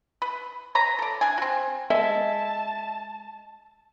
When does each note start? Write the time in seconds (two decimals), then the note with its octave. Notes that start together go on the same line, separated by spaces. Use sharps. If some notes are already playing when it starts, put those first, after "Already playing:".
0.22 B4
0.75 B4 C#5 A#5
0.99 A4 D5
1.21 D4 G#5
1.38 C4 F#4
1.90 G#3 E5 A5